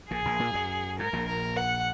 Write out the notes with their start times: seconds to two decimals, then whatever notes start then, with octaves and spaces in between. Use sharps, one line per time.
0.10 A#1 A#2 G#4
0.25 A#1 A#2
0.39 A#2 A#3
0.54 F#2 F#3
0.99 G#2 A#4
1.13 A#1 A#2
1.28 A#4
1.57 F#5